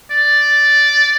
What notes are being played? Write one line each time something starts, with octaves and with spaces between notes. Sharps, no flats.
D5